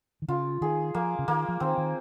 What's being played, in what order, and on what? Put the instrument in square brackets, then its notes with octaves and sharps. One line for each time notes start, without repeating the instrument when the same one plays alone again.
[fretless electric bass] D#3
[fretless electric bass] C#3 [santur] F4
[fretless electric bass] D#3 [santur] G#4
[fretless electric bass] F3 [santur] A#3
[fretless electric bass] C#3
[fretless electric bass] D#3 [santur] A#3
[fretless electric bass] F3
[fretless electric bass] D#3 [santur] C4
[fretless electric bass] D#3